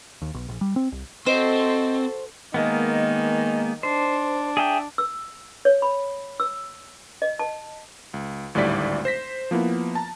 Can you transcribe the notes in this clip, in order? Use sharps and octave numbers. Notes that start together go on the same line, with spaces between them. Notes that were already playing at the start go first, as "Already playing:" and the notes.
D#2
B1
A#1
G3
C4
C2
C4 F#4 A4 C5 D#5
D#3 G#3 A#3 B3
D4 C5
G#4 E5 G5
E6
C#5
B5
E6
D#5
A5
C#2
G#1 D2 A2 G3 D5 B6
C5 A#6 B6
F3 A#3 B3 E4
A5 A#5